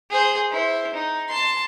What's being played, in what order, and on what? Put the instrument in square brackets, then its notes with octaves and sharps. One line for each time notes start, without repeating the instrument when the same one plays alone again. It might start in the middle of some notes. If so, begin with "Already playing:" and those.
[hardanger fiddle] G#4 C5
E4 C5
D#4
A5 C6